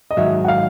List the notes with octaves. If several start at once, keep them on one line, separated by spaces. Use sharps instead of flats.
D#5
G#2 D#3 F#3 E5
F#5
F5